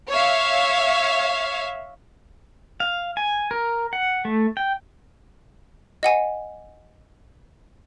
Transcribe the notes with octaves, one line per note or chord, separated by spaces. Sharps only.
C#5 E5 F5
F5
G#5
A#4
F#5
A3
G5
D#5 F#5 G#5